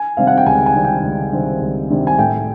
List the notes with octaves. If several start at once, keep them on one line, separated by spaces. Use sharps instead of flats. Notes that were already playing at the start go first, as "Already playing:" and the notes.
Already playing: G#5
C3 D#3 G3 C4 F5
F#5
G5
C#2 G#5
G#5
C3 D#3 G3 C4
G5
C#2
C3 D#3 G3 C4
C#2
C3 D#3 G3 C4
G#5
A2 G5